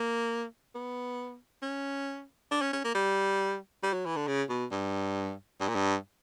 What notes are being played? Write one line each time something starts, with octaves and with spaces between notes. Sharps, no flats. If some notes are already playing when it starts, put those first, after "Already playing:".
Already playing: A#3
B3
C#4
D4
C#4
C#4
A#3
G3
G3
F#3
E3
D3
C#3
B2
G2
G2
A#2
G2